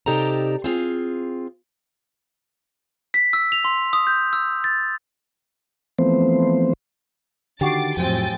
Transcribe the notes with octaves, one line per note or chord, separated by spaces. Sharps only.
C3 D#4 G4 A4 D5 A#5
C4 F4 G#4
B6
E6
F7
C6
D#6
G6
E6
A6
E3 F3 A3 B3 C4 C5
D3 D#3 F#4 G4 D6 A6 C7
F2 A2 F3 F#3 C4 G5 G#5 A6